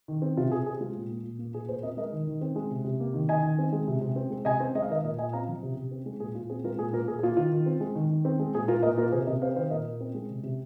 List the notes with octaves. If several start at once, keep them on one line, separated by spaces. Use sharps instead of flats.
D#3
C4
C3 F4
C3 G#4
C4 G#4
G#3 F4
A#2
A#3
A#2
A#3
A#2 G#4
A#2 G#4 C5
C4 A#4 D#5
G#3 A#4 D#5
D#3
D#3
C4
G#3
C3
C3
A#3
D#3
D#3 D#5 G#5
D#3
C4
G#3
C3
C3
C4
G#3
C3 D#5 G#5
C4
G#3 D#5
F5
D#3 A#4 D#5
A#2 A#4 D#5
A#2 D#5 G#5
C4 F5 A#5
F3
C3
C3
C4
G#3
A#2 G#4
A#2 F4
C4 G#4
G#3 F4 A#4
A#2 G#4
A#3 F4 A#4
A#2 G#4
G#4
A#3 F4
D#3 F4
D#3
C4
G#3
D#3
D#3
C4
G#3
A#2 G#4
A#3 F4 A#4
A#2 A#4 D#5
A#3 F4 A#4
C3 G#4 C5
C3 A#4 D#5
C4 C5 F5
D#3 C5 F5
A#2 A#4 D#5
A#2
C4
G#3
C3
C3